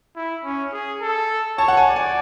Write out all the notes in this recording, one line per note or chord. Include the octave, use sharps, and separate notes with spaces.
E4
C#4
G#4
A4
C#5 A5
F#5
G#5
D5
G#5